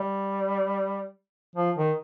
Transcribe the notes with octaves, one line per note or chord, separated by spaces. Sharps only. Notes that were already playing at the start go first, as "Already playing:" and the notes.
Already playing: G3
F3
D#3